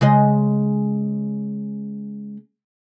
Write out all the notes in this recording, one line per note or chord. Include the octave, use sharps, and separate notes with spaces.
C#3 G#3 D#5